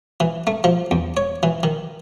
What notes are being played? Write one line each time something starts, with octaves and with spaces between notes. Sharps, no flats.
E3
A3
F3
E2
C#5
E3
D#3